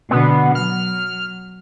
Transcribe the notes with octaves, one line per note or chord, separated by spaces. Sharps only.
B2 D3 B3
F#3 F6